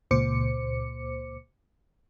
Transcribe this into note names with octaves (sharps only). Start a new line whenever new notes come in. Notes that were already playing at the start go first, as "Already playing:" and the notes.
C#2 A#2 C5 D6 C#7